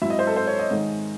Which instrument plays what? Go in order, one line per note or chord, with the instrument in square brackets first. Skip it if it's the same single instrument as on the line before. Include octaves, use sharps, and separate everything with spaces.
[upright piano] G#2 F#3 C4 E4 E5
D#5
C5
A4
C5
C#5
D#5
G#2 D#3 G#3